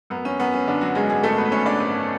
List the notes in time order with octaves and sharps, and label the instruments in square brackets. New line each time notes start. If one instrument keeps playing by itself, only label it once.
[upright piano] F#2 B3
C#4
F#2 B3
C#4
D3 D4
F#3 F#4
G#1 G#3 G#4
G#3 G#4
G#1 A3 A4
B3 B4
G#1 C#4 C#5
D4 D5
G#1